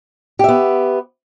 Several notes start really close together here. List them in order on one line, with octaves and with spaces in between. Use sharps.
G4 E5 B3